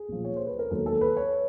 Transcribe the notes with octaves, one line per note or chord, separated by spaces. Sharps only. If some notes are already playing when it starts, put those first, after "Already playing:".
Already playing: G#4
B1 A#2 F3
C#5
C5
B4
A#4
E1 D#2 D#3 F#3 A4
A4
B4
C#5